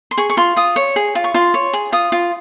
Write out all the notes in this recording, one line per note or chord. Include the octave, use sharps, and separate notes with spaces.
C6
G#4 C#6
C#6
F4 C6
F4 D#6
C#5
G#4
F4
C#6
F4 C6
C#5
G#4
F4 D#6
F4